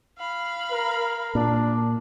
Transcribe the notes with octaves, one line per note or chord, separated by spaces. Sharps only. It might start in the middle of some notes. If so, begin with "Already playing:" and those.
F5 B5
A#4
A#2 D4